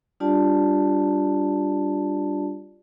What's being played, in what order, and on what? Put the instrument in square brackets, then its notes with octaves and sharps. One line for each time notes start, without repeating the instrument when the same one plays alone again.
[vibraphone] G3 D4 F4 G4 D5 A5